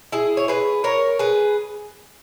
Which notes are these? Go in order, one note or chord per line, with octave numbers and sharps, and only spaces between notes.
E4 G#4
C#5
G#4 B4
A#4 C#5
G#4 B4